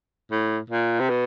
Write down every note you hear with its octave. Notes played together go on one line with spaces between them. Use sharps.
A2
A#2
C3
B2